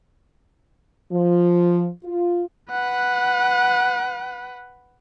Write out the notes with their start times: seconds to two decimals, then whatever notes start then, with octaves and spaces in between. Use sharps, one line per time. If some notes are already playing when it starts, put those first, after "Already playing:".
1.12 F3
2.05 F4
2.71 B4 F#5